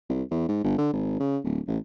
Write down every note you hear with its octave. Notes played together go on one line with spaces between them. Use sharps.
C2
E2
G#2
G1
D3
G#1
C#3
D1
A1